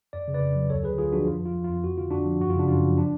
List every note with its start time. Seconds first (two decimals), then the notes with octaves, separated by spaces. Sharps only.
0.13 F2 D5
0.28 C#3
0.34 B4 D5
0.41 F2
0.55 F#3
0.69 D2 A4 C#5
0.84 D3 G#4 B4
0.98 D2 F4 G#4
1.12 F3 D4 F#4
1.27 F2 F4
1.40 F3 F4
1.56 F3
1.64 F4
1.69 F2
1.84 F2 F#4
1.98 D3 F4
2.11 F2 D4 F#4
2.26 F3
2.41 F#2 F#4
2.50 F4
2.55 C#3 D4
2.68 F#2 F4
2.84 F3
2.98 D4